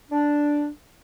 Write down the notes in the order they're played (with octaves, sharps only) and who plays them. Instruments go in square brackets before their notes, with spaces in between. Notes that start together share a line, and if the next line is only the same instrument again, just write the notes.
[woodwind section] D4